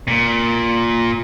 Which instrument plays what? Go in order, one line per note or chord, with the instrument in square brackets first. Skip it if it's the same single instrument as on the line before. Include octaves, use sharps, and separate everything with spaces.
[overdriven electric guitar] A#2